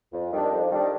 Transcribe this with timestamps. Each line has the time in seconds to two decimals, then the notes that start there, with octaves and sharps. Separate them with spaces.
0.12 F2
0.32 D#3 G3 D4
0.52 F2
0.71 D#3 G3 D4